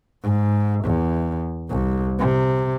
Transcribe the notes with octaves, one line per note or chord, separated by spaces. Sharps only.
G#2
E2
C2
C3